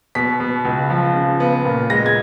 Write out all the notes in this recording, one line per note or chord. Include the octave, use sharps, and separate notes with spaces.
B2 B6
B2
C#2
F3
C#3
B3
A#2
G#3 A#6
G#6